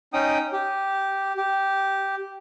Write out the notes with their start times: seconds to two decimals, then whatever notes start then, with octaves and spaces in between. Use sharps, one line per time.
0.13 C#4 D#4 G5 D#6
0.52 G4
1.37 G4